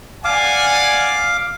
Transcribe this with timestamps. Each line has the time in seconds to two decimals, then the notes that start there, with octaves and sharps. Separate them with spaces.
0.24 D5 F5 F#5 G#5 D6